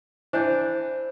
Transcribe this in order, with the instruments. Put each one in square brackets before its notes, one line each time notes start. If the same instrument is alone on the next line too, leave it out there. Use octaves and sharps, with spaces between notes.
[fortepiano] E3 D4 [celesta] C5 G6